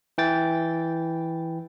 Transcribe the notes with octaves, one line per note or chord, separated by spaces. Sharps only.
E3 G5 A6